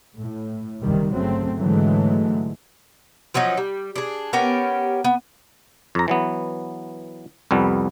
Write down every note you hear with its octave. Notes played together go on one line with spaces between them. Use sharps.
A2
F#1 D#2 C3 D#3 G3
G1 C#3 F#3 A3 C4
G#2 D3 E3 F#3 G#3 A3
F3 F#3 C#4 D#4
G3
D4 G#4
B3 C#4 G4 A#4
B3
F2 A#5
E3 F#3 B3
C2 F2 G3 B3